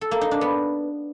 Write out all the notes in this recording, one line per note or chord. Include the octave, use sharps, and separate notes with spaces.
A4
A#3
D#4
D4
B3